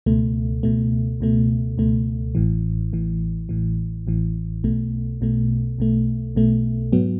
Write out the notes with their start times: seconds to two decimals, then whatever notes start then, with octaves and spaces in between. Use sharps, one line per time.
0.06 C#2 B2 A3
0.63 C#2 B2 A3
1.20 C#2 B2 A3
1.78 C#2 B2 A3
2.35 A1 A2 E3
2.93 A1 A2 E3
3.49 A1 A2 E3
4.07 A1 A2 E3
4.64 B1 B2 A3
5.21 B1 B2 A3
5.78 B1 B2 A3
6.36 B1 B2 A3
6.92 G#2 F#3 B3